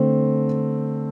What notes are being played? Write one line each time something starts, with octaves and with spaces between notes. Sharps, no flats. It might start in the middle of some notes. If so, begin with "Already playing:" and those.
Already playing: D3 A3 C4